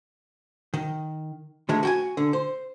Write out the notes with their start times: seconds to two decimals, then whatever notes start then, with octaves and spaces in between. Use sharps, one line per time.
0.74 D#3
1.69 D3 D#3 G#3 A3
1.83 F#4 G5 G#5
2.17 D3
2.33 C5